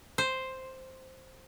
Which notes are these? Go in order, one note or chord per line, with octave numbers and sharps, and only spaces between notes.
C5